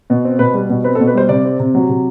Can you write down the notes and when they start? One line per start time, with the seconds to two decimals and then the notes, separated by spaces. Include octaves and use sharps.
0.10 B2
0.25 C4
0.39 B2 B4
0.54 G3
0.69 B2
0.84 C4 B4
0.95 A4
1.00 B2
1.07 B4
1.14 G3 C5
1.29 C3 D5
1.45 C4
1.60 C3
1.75 F#3
1.89 C3